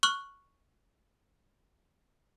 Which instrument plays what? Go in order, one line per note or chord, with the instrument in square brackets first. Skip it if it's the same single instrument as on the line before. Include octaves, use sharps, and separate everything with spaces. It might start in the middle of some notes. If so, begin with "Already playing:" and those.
[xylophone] C#6 F6 F#6 F#7